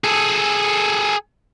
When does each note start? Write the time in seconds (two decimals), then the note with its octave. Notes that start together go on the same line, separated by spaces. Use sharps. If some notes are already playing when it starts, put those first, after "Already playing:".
0.04 G#4 A4